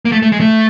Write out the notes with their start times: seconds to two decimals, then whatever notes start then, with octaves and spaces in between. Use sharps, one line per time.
0.05 A#3
0.12 A3
0.22 A3
0.32 G#3
0.40 A3